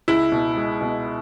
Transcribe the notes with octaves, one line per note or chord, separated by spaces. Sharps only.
C#2 E4
B2
G#3
B2